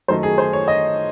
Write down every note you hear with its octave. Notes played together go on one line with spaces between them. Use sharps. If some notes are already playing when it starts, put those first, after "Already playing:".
F#2 D#3 A3 D#4 C5
G#4
C5
C#5
D#5